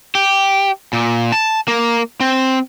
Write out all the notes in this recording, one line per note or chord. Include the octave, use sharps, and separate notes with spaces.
G4
A#2
A5
A#3
C4